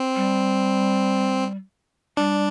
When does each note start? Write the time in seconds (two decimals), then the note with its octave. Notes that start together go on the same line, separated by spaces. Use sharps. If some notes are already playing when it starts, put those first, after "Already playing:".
Already playing: C4
0.16 G3
2.17 G3 D4